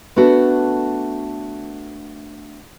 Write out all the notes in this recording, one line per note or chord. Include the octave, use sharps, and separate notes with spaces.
A3 B3 D4 F#4 A4